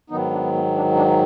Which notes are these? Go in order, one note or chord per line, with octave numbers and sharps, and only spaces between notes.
G#2 D#3 F#3 B3 D#4
D4
B3
D4
D4